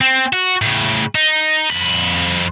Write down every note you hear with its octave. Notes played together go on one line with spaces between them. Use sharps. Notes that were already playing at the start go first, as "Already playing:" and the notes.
C4
F#4
A2 C#3
D#4
F2 B5